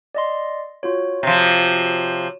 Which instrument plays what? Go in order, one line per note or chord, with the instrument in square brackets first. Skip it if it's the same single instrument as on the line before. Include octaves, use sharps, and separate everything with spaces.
[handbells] D5 D#5 C6
F4 F#4 C#5
[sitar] C3 F3